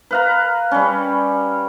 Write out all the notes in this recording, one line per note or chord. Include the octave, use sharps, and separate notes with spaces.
B4 F5 A#5
G3 C#4